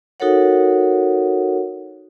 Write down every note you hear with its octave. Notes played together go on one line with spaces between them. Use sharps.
D#4 F#4 A4 A#4 C#5 F#5